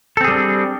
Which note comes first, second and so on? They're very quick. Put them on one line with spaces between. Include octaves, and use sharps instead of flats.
A4 C4 G#4 G3 D4